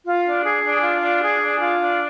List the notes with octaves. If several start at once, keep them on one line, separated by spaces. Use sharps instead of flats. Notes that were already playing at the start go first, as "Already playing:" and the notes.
F4
D4
G#4
D4
F4
D4
G#4
D4
F4
D4